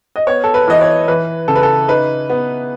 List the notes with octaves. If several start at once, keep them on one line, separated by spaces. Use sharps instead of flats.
D#5
B3 C#5
A4
B4
E3 D#5
C#5
E3 B4
C#3 A4
B4
A4
D#4 B4
B3